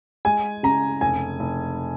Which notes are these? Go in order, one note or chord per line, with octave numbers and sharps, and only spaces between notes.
G#3 G#5
C#3 A#5
F1 G#5
F1